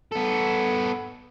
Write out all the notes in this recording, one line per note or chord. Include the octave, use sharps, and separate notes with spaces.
B3 A4